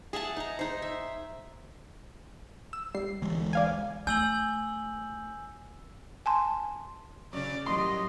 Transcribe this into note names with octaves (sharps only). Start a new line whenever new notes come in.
G#4 E5 F#5 A5
D#4 A#5
D#4 C5
E5
E6
G3 C7
D2 E3 G#3
D5 F5 G#5
A3 G#5 E6 G6 F#7
G#5 A5 C6
C#3 F#3 C#4 D5
A2 D#3 F#3 G3 D#5 C6